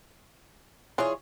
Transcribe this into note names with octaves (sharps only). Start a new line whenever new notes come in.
E3 F4 G#4 C#5